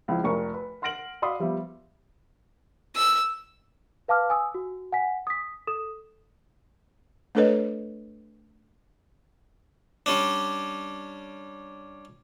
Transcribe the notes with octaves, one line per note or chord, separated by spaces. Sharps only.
C#2 F3 E4
F1 A#4 C#6
B4
F#5 C6 F6 A#6 D7 F#7
F#4 D5 F5 B5 C6 D#6
F3 G3 B3 E5
E6
B4 F5 A5 D6 F6
G#5 D#6 E6
F#4
F#5 G#5 B6
D#6 B6
A4 D#6 E7
A3 D4 A4 B4 C#5 D#5
G3 C#4 D4